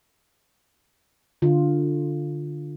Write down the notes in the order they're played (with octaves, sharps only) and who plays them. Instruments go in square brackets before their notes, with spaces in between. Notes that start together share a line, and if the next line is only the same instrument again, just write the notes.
[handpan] D3 F4